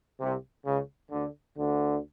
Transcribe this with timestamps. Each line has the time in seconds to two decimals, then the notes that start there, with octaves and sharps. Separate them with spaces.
0.21 C2 C3
0.66 C#2 C#3
1.11 D2 D3
1.57 D2 D3